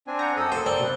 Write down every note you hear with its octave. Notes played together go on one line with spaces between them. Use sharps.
C4 D4 G#5
F#5 A#5 G6
F#2 A4 D#6 E6
A#3 A4 C5
C4 D5
B2 B4